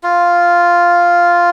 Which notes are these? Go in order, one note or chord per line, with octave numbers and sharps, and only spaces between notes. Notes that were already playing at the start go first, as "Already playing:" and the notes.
F4